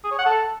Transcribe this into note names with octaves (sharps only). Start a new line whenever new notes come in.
G#4
C#5
F#5
A4